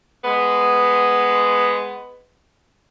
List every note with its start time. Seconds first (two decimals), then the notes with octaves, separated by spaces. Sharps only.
0.24 G#3 B3